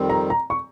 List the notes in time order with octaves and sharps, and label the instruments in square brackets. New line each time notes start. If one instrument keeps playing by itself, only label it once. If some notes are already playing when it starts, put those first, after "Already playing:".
Already playing: [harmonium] F2 D#3 G3 C4
[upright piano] A#5
A#5
C#6